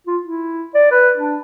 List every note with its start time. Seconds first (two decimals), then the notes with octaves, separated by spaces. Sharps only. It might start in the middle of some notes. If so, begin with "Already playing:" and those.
0.07 F4
0.23 E4
0.75 D5
0.91 B4
1.17 D4